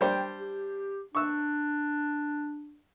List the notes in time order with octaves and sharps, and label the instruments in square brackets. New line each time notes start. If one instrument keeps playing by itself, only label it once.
[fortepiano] G3 D4 C5 [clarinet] G5
[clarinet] G4
[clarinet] D4 [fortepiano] C#6 E6